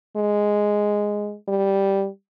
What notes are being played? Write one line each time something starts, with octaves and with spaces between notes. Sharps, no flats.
G#3
G3